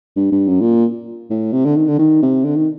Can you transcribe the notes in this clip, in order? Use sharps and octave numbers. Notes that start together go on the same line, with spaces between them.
G2
G2
F#2
A#2
A2
C3
D3
D#3
D3
D#3
C3
D3
D#3